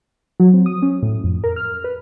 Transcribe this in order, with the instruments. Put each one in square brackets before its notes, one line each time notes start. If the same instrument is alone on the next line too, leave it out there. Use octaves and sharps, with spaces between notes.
[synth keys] F#3
C4
D#6
C#4
A2
F2
A#4
F6
B4